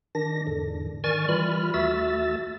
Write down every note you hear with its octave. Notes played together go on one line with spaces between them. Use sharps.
D#3 D4 A#6
E2 G#2 D3
D#3 D5 G#5 C#6 F6 A6
E3 G3 F4 B5 F6
D#2 A3 F#4 E5 E6 A6